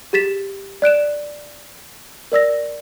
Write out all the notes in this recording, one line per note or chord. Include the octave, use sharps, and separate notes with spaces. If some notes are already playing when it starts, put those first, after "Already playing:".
G4 G#4 A6 B6 E7
D5 F#6 D7 E7
A#4 D5 E6 A#6